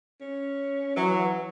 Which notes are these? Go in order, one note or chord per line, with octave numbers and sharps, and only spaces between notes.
C#4
E3 F#3